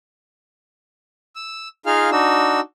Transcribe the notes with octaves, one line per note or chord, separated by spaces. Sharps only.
E6
D#4 F4 G#4 F5 F6
D4 D#4 F#4 E6